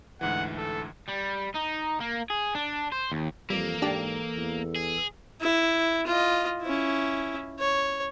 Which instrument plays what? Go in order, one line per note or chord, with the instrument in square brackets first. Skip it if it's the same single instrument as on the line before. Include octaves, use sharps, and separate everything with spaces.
[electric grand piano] D2 G#2 E3 [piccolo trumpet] F#5
[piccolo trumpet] A4
[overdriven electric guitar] G3
D#4
A#3
G#4
D4
C5
D#2
[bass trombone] F2 [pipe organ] E3 A4 [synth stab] G3 [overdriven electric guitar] A#3
[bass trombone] G#2 [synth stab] D4 G4
[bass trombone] E2
[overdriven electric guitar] G#4
[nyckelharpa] E4
F4 D#5
C#4 E4
C#5